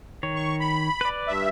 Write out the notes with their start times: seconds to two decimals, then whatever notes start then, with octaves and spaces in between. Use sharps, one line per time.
0.23 D#3 C#5
0.36 C#6
0.60 B5
1.01 B4 D5
1.28 G2 E5